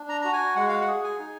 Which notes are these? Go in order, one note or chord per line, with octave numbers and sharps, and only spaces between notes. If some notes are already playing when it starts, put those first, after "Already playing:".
Already playing: D4
A#5
F#4 A#5
G#5
G#3 F#5
F5
F#5
G#4
G#5
D#4